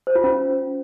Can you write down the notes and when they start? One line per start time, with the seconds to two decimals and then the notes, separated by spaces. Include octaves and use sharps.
0.07 C5
0.15 F4
0.24 C#4